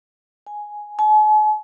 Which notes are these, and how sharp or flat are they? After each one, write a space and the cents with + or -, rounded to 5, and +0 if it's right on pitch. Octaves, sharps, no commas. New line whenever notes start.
G#5 +5
G#5 +45